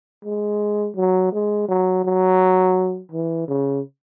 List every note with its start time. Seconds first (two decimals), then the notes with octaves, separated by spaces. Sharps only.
0.25 G#3
0.96 F#3
1.33 G#3
1.68 F#3
2.04 F#3
3.12 E3
3.48 C#3